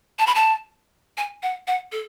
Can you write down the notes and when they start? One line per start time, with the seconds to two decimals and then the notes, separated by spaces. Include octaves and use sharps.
0.19 A5
0.27 B5
0.35 A5
1.17 G#5
1.43 F#5
1.67 F#5
1.92 A4